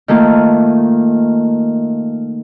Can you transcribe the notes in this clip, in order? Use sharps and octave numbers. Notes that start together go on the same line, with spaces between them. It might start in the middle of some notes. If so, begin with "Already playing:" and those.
D#3 A3 A#3 F4